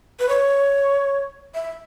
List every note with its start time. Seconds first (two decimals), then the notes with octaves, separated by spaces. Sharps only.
0.20 B4
0.29 C#5
1.54 E5